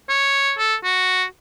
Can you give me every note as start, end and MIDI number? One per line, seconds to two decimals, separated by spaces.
0.10 0.54 73
0.59 0.75 69
0.84 1.24 66